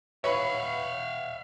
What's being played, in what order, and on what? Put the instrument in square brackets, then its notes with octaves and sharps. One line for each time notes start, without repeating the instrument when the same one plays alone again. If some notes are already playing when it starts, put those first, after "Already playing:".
[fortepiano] B4 C#5 [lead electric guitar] E5 F5